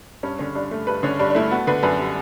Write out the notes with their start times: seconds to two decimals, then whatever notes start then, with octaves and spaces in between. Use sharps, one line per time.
0.23 G2 C#4
0.39 D3 C#4
0.55 G2 D4
0.71 A3
0.87 G2 B4
1.03 D3 C#4
1.19 G2 D4
1.30 D4
1.35 A3 E4
1.51 B3 F#4
1.67 D3 B4
1.83 F#2 B4
1.99 G3